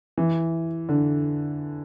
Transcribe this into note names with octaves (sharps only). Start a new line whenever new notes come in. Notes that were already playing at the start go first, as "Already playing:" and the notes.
E3
D3